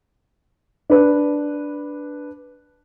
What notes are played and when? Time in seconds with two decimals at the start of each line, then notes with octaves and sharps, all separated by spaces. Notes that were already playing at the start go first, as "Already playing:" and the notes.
0.90 D4 B4